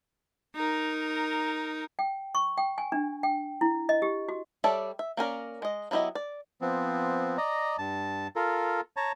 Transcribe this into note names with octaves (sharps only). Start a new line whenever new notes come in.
D#4 A#4
G5
C#6
G5
G#5
D4
G5
E4
D#5
G4
F#4
G3 A4 C#5 D5 E5
E5
A#3 C#4 A#4 D5
G#3 D#5
F#3 B3 E4 G4 D#5
D5
F3 B3 C4
D5 D#5 A#5
G2 A5
F4 A4 A#4
C#5 A5 A#5